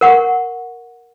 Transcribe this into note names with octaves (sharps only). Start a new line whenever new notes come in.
A#4 F#5 C#6